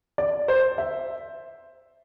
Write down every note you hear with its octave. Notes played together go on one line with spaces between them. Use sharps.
D5
C5
E5